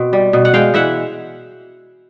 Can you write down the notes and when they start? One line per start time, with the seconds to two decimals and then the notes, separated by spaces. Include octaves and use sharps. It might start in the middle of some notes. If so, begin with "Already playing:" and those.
Already playing: B2 C4
0.13 G3
0.33 B2
0.45 F#5
0.54 G#3 F5 G5
0.74 E3 E5 F#5